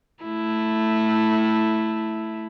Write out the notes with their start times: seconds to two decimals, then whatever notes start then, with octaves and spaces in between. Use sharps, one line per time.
0.24 A3 E4